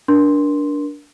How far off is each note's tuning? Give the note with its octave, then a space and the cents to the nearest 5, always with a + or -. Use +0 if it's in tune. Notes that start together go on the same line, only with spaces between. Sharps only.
D4 -10 A#4 +30 C6 +0